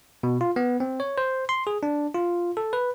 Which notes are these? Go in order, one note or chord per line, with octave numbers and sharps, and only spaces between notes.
B2
F4
B3
C4
C#5
C5
C6
G#4
D4
F4
A4
B4